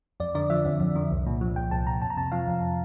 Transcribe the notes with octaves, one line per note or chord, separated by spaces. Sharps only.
F2 D5
D3 D5
F3 E5
F2
F2
D3
C2
A#2
F3
C2 G5
C2 A5
A#2 A#5
F2 A5
A#5
C3 A5
F3 F5
F2